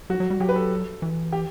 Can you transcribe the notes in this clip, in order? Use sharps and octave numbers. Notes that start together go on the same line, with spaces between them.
F#3 F#4
F#3
G3
F#3 G4
B4
A4
E3
G4